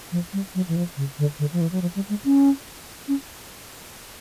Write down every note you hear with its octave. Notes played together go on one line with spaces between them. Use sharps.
F3
G3
F#3
E3
F3
C#3
D3
D3
F3
E3
F#3
F3
G3
G#3
C#4
C#4